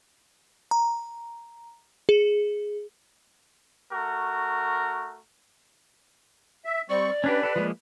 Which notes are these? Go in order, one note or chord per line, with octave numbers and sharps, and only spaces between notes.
A#5
G#4
A3 F#4 A#4
E5
G3 C4 D5 C#6
C#4 D4 G4 B4
G4 A4
F3 G#3 A#3